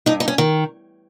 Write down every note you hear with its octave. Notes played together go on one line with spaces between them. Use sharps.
G2 D#4
D#4
C#4
D#3